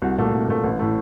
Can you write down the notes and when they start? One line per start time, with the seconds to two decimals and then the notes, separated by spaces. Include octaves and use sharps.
0.02 C2 F#4
0.18 A#2 A3
0.33 C2
0.48 A#2 A3
0.63 A1
0.79 A2 A3